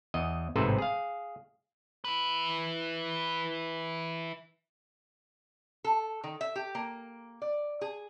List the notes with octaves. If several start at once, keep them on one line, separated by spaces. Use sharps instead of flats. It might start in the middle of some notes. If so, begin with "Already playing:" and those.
E2 D#5
A1 G#2 C3 A4 B4 C5
G#4 F5
E4 B4
A4
D#3
E5
G4
A#3
D5
G#4